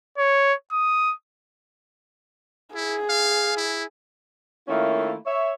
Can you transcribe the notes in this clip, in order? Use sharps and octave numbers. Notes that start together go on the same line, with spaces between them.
C#5
D#6
E4 G#4
F5
E4
D#3 A3 A#3 C#4 E4 F4
C#5 E5